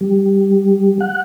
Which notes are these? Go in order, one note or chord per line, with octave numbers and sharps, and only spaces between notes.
G3
F#5